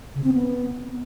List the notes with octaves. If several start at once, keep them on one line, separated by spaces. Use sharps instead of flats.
C#3
C4
B3